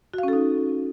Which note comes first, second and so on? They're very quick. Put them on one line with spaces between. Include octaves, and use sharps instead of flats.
F#4 F5 C#4 A4 D#4